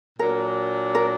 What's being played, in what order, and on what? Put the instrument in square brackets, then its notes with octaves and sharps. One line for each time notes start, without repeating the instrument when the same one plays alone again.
[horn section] A#2 F#3 D4 [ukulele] A#4
[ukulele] A#4